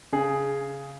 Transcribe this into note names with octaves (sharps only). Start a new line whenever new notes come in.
C#3 G#4